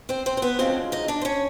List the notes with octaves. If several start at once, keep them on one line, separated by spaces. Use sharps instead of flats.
C4 C5
C4 C5
C5
B3 B4
D2 C#3 F3 G#3 C4 C5
D#4 D#5
D4 D5
C5
C#4 C#5